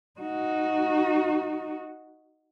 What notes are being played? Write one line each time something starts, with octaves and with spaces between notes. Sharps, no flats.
D#4 F#4